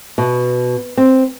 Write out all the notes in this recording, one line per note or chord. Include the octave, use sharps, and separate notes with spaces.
B2
C4